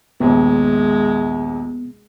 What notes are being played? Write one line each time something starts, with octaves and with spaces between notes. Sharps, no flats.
A#1 D#2 G#3 B3